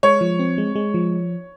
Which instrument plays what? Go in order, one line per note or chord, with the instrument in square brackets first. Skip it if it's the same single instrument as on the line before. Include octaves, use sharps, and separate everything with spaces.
[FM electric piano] G#3 [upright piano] C#5
[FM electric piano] F3
C4
G#3
G#3
F3